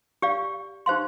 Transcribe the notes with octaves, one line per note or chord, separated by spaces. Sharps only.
G4 D5 F5
D#4 G4 C5 F5 C6